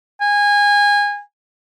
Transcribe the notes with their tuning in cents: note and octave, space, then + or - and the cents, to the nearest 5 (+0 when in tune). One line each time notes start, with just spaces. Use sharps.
G#5 -25